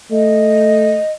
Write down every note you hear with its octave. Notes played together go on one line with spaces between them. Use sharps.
A3 D#5